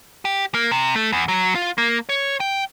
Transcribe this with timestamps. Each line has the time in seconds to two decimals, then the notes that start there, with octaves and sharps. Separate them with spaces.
0.25 G4
0.54 A#3
0.72 C3
0.96 A3
1.12 E2
1.28 F#3
1.55 F4
1.78 A#3
2.09 C#5
2.40 G5